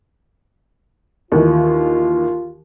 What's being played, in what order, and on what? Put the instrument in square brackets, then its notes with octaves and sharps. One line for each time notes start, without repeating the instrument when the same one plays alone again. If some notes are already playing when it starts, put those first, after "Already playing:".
[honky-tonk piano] D#2 D#3 E3 [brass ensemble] F4